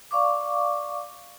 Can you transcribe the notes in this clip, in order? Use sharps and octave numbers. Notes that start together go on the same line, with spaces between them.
D5 F5 C#6 D6